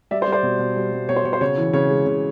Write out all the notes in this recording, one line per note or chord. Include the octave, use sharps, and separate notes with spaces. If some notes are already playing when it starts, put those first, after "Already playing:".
G3 D5 E5
C5 D5
G3
C5 D5
B2
B2
G3
G3
B2 C#5
C5
B2 C#5
C5
C#3 C#5
E3
C#3 C#5
G#3
C#3